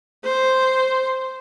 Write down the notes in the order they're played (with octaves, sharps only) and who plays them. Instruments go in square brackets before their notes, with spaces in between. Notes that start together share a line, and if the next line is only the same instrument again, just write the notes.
[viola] C5